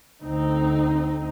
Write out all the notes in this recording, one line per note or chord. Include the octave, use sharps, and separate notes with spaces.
D2 C4 D#4